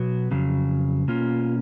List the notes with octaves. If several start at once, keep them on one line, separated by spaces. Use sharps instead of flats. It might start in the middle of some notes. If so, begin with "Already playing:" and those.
Already playing: B2 F#3 B3
F2 C#3 F#3
B2 A#3 C#4 F4